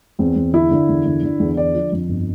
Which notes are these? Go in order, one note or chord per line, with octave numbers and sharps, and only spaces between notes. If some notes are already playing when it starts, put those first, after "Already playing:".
E2 C4
E2
D3 E4
D3
E2
D3
D3
E2
D3 D5
F3
F2
G1